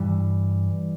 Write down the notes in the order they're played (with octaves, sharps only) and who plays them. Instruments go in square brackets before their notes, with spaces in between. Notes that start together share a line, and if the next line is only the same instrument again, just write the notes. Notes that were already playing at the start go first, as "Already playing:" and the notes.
Already playing: [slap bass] G2 D3 E3 G3